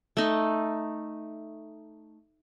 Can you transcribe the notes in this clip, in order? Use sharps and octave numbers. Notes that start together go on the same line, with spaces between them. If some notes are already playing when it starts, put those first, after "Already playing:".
A3 D#4